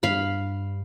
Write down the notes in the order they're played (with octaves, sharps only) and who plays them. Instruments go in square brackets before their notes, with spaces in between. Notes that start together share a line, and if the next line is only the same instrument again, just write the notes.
[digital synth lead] G2 [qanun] F5 B5